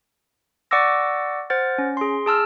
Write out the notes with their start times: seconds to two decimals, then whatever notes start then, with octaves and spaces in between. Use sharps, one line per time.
0.71 D5 F#5 C#6 D6 E6 A#6
1.50 C5 F#5 F6 A6
1.78 C#4
1.97 G#4 C6
2.26 G#4 A5 E6 F6